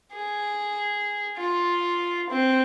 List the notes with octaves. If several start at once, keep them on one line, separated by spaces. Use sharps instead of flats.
G#4
F4
C4